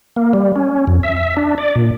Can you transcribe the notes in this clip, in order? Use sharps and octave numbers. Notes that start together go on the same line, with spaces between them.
A#3
G3
C#4
F2
E5
E5
D4
D5
A#2